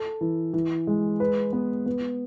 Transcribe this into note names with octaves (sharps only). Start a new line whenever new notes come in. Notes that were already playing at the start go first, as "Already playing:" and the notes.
Already playing: A4
E3
E3
G#3
B4
B3
B3